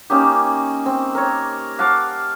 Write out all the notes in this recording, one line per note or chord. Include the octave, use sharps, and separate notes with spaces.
A#3 C#4 D#4 G4
C4
A#4 C#5
F5 F#5 A5 D6